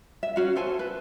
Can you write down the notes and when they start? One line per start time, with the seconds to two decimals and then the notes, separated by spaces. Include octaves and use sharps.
0.23 E5
0.36 C#4 F#4 F5
0.56 A4 C5 G#5 A5
0.79 B4